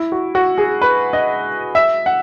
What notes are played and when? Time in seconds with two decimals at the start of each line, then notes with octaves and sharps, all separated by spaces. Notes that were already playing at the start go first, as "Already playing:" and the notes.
Already playing: E4
0.12 F#4
0.35 F#4
0.58 G#4
0.81 B4
1.13 D#5
1.75 E5
2.06 F#5